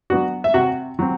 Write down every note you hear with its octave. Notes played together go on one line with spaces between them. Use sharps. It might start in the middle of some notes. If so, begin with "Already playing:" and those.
F#3 B3 D4 F#4 F#5
E5
C3 F#4 F#5
F#3 C4